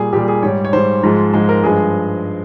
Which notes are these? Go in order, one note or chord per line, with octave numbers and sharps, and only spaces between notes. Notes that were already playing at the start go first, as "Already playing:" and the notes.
Already playing: A#2 G3 G#4
A#2 G3 G4
G#4
G#2 G3 C#5
C#5
G#2 G3 C5
G#2 F3 G#3
G#2 F3 G#3
A#4
G2 F3 G#3 G#4